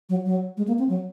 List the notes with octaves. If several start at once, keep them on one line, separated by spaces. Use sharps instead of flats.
F#3
F#3
G#3
A#3
C4
F#3